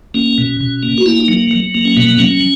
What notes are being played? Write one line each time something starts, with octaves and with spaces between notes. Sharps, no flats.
A#3 C#4
B2
B2
A#3
F#4
A#3 E4
D#4
F#3
F#3
A#3
C#4
B2 B3
F#3 C#4